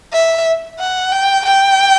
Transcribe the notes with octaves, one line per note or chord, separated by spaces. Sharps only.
E5
F#5
G5
G5